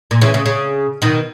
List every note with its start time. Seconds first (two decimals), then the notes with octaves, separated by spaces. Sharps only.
0.11 A#2
0.21 C#3 E3
0.34 C#3
0.46 C#3
1.02 B2 D#3